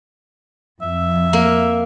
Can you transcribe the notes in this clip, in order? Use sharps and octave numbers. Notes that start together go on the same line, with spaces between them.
F2 E5
A#3